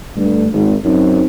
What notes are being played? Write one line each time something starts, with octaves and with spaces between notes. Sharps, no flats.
G2 D3 A3
G#1
F#2 F#3 C4 D#4